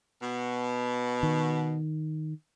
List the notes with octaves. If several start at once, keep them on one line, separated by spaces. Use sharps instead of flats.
B2
D#3